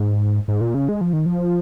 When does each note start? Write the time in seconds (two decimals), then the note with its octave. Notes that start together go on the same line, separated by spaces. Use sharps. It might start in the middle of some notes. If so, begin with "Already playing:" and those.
Already playing: G#2
0.48 G#2
0.61 A#2
0.75 C#3
0.89 G#3
1.01 F3
1.13 D#3
1.26 F3